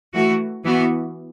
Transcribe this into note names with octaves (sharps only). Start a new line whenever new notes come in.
E3 A3 F#4
E3 B3 F#4